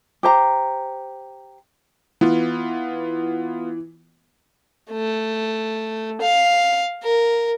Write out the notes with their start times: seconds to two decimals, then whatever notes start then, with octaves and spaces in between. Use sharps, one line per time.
0.23 G4 C5 A#5
2.21 E3 B3 F4
4.91 A3
6.21 F5
7.03 A#4